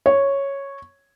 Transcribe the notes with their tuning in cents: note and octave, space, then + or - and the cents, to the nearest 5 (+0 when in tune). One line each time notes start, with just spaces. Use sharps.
C#5 -5